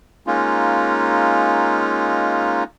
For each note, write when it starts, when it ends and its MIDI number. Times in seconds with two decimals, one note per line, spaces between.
0.27 2.64 56
0.27 2.64 58
0.27 2.64 61
0.27 2.64 63
0.27 2.64 65